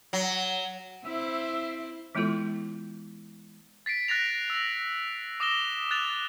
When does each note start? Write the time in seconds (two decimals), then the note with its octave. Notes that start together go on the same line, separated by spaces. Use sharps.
0.13 F#3
1.04 C4 E4 C5 E5
2.15 E3 G#3 B3 E4 F4 A4
3.86 A6 B6 C7 D7
4.08 F#6 A6 A#6 F7
4.50 E6 A#6
5.40 D6 D#6 A#6 E7 G7
5.91 F#6 A6 F7